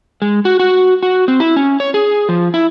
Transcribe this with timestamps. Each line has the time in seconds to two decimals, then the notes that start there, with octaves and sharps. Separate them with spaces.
0.22 G#3
0.45 F#4
0.59 F#4
1.03 F#4
1.28 C4
1.40 E4
1.56 C#4
1.80 C#5
1.94 G#4
2.29 F3
2.54 E4